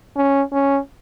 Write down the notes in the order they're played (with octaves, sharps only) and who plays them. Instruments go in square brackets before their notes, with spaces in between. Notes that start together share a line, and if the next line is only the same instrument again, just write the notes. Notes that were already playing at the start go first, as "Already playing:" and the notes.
[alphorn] C#4
C#4